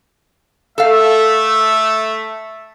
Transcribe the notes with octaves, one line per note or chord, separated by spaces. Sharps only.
A3 A4 E5 F5